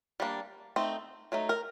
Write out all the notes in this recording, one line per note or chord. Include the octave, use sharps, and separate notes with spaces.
G3 A#3 D4
A3 C4 D#4
F#3 A3 D#4
A#4